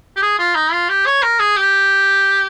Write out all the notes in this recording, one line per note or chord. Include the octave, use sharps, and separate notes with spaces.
G4
G#4
F4
D#4
F4
G4
C#5
A#4
G#4
G4